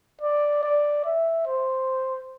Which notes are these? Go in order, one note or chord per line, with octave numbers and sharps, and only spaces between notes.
D5
D5
E5
C5